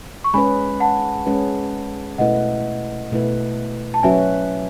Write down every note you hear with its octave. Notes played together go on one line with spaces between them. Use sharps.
C#6
G#3 C#4 G#4 B4 G#5 B5
F#5 A5
G#3 C#4 G#4 B4
B2 A3 E4 B4 D#5 F#5
B2 A3 E4 B4
A5
F#3 C#4 F#4 B4 E5 G#5